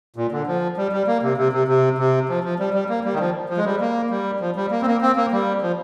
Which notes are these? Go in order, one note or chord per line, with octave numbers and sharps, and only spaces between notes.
A#2
D3
F3
G3
G3
A#3
C3
C3
C3
C3
C3
F3
F3
G3
G3
A#3
G3
D#3
F3
F3
G#3
G3
A#3
G3
F3
G3
A#3
C4
A#3
C4
A#3
G3
F3